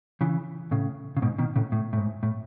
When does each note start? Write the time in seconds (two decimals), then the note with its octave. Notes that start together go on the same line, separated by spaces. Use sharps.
0.21 C#3 E3
0.71 A2 C#3
1.17 C#3
1.22 G#2 B2
1.38 B2 D#3
1.56 A2 C#3
1.72 A2
1.93 A2
1.98 G#2
2.23 A2